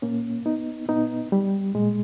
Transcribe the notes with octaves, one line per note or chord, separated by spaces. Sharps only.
A#2 A#3 C#4
B3 D#4
A#2 B3 D#4
G3
A#2 G#3